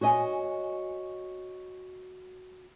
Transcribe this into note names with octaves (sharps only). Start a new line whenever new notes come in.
F#4 C#5 D#5 G#5